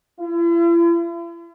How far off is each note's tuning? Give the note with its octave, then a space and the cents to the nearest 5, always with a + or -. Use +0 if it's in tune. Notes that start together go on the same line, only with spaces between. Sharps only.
E4 +45